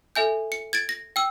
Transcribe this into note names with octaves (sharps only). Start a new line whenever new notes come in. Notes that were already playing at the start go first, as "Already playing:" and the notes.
A4 E5 G#5 G6
C#7
G#6 A6 D7
A#6
G5 E6